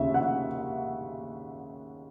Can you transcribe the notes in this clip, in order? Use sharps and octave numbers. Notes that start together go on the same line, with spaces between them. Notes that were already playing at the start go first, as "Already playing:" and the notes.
Already playing: D#2 C#3 E5
F#5